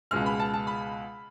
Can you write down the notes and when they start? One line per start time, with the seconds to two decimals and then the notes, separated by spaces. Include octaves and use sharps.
0.11 C#2 B2 G#3 F6
0.26 B5
0.40 A5
0.54 A5
0.67 B5